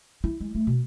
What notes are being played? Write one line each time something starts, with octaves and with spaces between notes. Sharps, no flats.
E4
G#3
A3
B2